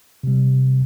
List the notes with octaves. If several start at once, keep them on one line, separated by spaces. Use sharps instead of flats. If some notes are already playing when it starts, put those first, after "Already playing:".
C3 G3